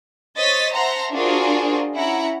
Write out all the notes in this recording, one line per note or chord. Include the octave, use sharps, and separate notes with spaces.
C5 C#5 D#5 A6 B6
C5 E5 F#5 A5 A#5 C6
D4 F4 F#4 G#4 A#4 C5
C#4 E4 F#5 A#5